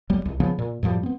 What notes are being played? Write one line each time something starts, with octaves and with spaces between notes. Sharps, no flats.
D1 F#3 G3 B3
C2
C#3 F3 B3
A#2
F#2 A2 F3 G3
B3 C4